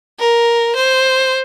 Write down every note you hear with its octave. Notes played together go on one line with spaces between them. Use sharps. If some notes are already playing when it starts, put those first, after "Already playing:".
A#4
C5